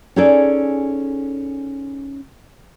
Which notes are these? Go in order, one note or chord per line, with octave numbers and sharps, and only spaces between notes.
C#4 D#4 G#4 A4 D5